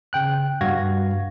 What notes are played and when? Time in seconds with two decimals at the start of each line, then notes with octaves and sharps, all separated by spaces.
0.13 C#3 G5 F#6
0.61 G2 G3 F#4 F5 G#6 A#6